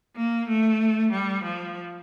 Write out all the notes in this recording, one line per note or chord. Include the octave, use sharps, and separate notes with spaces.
A#3
A3
G3
F3